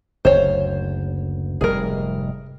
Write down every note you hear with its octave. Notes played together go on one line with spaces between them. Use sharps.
F#1 D2 C5 C#5
F1 G#2 G3 G#4 A#4